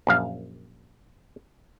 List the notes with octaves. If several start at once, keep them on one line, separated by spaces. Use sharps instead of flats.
A#1 F#2 F5